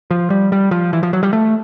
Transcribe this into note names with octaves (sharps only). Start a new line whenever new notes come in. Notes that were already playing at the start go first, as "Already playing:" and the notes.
F3
G3
G3
F3
E3
F3
F#3
G3
A3